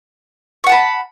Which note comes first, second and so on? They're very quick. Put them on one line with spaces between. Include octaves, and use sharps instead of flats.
C#6 F#5 A5 B5